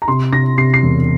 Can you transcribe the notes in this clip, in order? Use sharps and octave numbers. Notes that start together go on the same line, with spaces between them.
A#5
C3 C6
C3 A#6
C3 C7
C7
E1